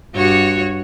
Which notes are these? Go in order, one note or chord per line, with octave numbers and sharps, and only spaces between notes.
G2 F#4 C#5